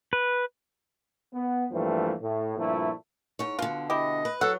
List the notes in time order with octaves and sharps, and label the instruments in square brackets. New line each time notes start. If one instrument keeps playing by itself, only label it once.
[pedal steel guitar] B4
[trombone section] B3
G2 E3 F3 G3 A3 A#3
A2
G2 A#2 F3 A3 E4
[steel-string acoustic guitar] G#2 C#5
[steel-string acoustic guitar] B2 D3 [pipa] F4
[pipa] E4 G4 [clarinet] D#5
[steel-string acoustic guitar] B4
[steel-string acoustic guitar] F#3 [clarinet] A4 [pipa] F#5